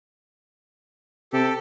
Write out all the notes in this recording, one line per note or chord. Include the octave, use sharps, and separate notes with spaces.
C3 G4 A4